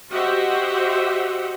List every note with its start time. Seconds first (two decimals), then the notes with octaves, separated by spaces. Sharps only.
0.11 F#4 G4 C5 D#5 E5 F#5